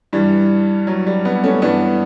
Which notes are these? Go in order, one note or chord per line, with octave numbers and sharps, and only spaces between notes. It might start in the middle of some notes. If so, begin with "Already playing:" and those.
G2 E3 G3
F#3
G3
G3 B3
A3 C#4
G2 E3 B3 D4